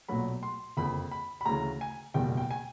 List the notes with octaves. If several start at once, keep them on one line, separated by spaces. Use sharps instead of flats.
B1 A#2 F#3 A3 B5
C6
F#1 F2 D3 B5
B5
B5
D2 C#3 E3 A3 A#5
G#5
F#1 E2 B2 G3 G5
G5
G#5